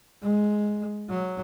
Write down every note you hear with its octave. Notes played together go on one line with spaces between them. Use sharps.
G#3
F#3